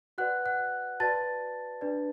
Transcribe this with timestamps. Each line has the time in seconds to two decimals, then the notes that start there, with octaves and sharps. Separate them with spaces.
0.18 F#4 B4 D5 F#5 F#6
0.46 F#5 F#6
1.00 F#4 B4 D5 A5 A6
1.81 D4 B4 D5